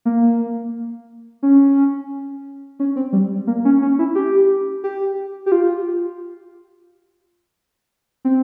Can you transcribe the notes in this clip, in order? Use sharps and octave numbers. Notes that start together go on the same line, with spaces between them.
A#3
C#4
C#4
C4
G3
A#3
C#4
C#4
E4
G4
G4
G4
F4
C4